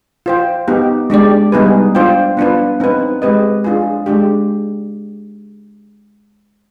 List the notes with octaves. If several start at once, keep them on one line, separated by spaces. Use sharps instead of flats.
F4 C5 G5
B3 D#4 G4
G#3 D4 G4 D5
G3 B3 D#4 G#4 B4
D4 F4 C5 G5
B3 D4 F4 B4
C4 D#4 B4
G#3 C4 G4 B4 D#5
D4 F4 G#4
G#3 D4 G4